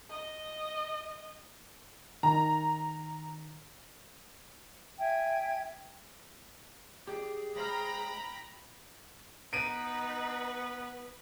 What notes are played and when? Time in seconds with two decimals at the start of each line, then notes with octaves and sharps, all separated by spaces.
0.10 D#5
2.23 D#3 A#5
4.99 E5 G5 G#5 G#6
7.07 G4 G#4 D5 G5
7.56 G#3 C5 G5 A#5 B5 F6
9.53 B3 D#4 B4 D7 D#7